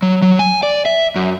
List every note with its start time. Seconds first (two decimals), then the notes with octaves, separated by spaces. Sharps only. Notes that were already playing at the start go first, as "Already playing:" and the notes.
0.02 F#3
0.22 F#3
0.39 G#5
0.63 D5
0.86 E5
1.16 F#2